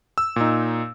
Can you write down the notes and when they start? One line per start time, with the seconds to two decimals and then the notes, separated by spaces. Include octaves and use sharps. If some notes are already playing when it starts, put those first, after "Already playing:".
0.18 E6
0.36 A#2 D#4